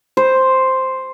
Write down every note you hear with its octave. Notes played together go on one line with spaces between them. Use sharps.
C5